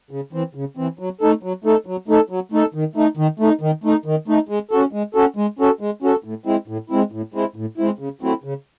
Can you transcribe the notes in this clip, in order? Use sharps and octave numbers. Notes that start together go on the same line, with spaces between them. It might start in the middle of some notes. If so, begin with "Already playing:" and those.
C#3
E3 C4
C#3
E3 C4
F#3
A3 D#4 A4
F#3
A3 D#4 A4
F#3
A3 D#4 A4
F#3
A3 D#4 A4
D#3
A3 D#4
D#3
A3 D#4
D#3
A3 D#4
D#3
A3 D#4
G#3
C#4 F#4 A4
G#3
C#4 F#4 A4
G#3
C#4 F#4 A4
G#3
C#4 F#4 A4
A2
G#3 C4 E4
A2
G#3 C4 E4
A2
G#3 C4 E4
A2
G#3 C4 E4
C#3
F#3 A3 C4 E4
C#3